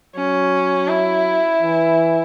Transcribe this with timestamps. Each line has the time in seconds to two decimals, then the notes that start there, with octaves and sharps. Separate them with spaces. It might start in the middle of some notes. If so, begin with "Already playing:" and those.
0.16 F#3 C#4
0.88 E4
1.62 E3